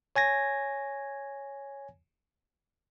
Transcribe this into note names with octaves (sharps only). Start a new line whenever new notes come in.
C#5 G#5 G#6 A#6